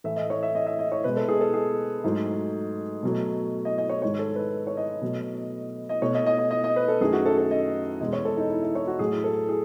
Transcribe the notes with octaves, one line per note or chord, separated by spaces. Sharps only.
A2 E3 A3 E5
D#5
C#5
E5
D#5
E5
D#5
C#5
B2 G#3 B4
A4
G#4
A4
G#4
G#2 F#3 A3
B2 F#3 A3
D#5
D#5
C#5
G#2 D#3 G#3 C#5
A4
B4
C#5
D#5
B2 F#3 A3
D#5
B2 A3 C#5
D#5
D#5
D#5
D#5
D#5
B4
A4
F#2 D#3 A3 G#4
F#4
A4
A4
D#5
E2 B2 G#3 D#5
C#5
A4
D#4
E4
E4
C#5
F#4
A2 F#3 A3 G#4
A4
G#4